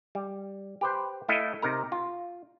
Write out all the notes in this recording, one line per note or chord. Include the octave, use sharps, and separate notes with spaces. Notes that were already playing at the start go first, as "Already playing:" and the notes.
G3
G4 B4 C5
A3 E4 A4 D#5 F5
C3 D#4 A#4 A#5
F4